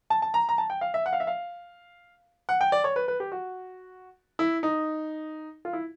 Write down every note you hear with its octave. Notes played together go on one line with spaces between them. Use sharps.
A5
A5
A#5
A#5
A5
G5
F5
E5
F#5
F5
E5
F5
F#5
G5
D5
C#5
B4
B4
G4
F#4
E4
D#4
F4
E4